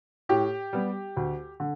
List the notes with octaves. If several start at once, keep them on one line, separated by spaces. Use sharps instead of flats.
A2 G4
G3 B3
D2
D3